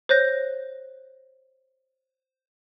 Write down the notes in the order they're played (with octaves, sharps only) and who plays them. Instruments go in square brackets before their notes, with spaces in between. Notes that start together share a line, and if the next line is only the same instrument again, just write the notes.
[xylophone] C5 C#5 F#6 G6 A#6